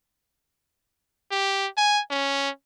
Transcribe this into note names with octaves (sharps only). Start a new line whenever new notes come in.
G4
G#5
C#4